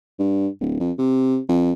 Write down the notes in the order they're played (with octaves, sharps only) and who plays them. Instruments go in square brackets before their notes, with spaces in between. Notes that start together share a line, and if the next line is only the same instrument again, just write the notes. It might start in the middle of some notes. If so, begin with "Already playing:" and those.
[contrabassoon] G2
D1
F2
C3
F2